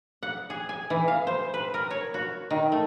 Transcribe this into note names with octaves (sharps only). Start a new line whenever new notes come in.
F#5
G#4
G#5
E3
F5
C5
B4
A#4
C#5
F#4
D#3
A3